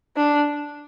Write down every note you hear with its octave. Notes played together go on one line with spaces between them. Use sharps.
D4